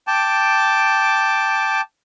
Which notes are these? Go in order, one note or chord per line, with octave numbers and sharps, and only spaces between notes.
G5 A5 D6